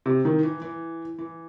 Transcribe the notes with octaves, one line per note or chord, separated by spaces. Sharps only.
C3
D#3
E3
E3
E3